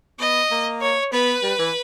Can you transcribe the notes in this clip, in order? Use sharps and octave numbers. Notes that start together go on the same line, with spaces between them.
B3 D#5
A#3
C#5
B3 B4
G3
E3